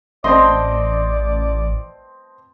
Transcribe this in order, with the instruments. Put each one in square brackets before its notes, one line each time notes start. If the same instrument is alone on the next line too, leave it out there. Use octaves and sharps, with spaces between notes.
[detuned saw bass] A1 [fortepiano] C4 D#5 [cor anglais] D5 [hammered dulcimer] A5 C6